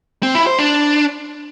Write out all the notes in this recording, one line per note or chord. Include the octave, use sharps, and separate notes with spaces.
C4
E4
C5
D4